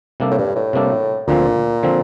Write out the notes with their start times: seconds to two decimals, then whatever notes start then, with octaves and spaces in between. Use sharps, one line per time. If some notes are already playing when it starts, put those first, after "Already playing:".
0.20 C3 G3 A#3 D4 A4
0.31 A2
0.38 G2
0.56 A2
0.73 C3 G3 A#3 D4 A4
1.28 D2 A#2 D3 F3 C4
1.83 D3 F3 C4